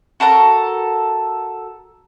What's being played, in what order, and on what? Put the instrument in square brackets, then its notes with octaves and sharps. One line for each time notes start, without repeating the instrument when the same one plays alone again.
[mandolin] F#4 A4 A#4 A#5